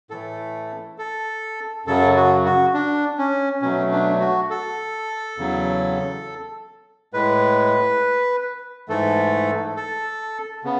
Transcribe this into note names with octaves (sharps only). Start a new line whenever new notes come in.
A2 E3 A3 A4
A4
F#2 C#3 F#3 A4
F#4
F#4
D4
C#4
B2 F#3 A3 C#4
D4
F#4
A4
E2 C#3 F#3
A2 G#3 B4
G#2 E3 A3 A4
A4
C#3 B3